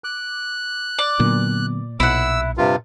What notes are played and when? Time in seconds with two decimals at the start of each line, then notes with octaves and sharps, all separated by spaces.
0.04 D6 F#6
0.98 D5
1.20 A#2 D3 F#3 B3
2.00 B1 A#2 E4 F#5 E6
2.57 G2 C3 F4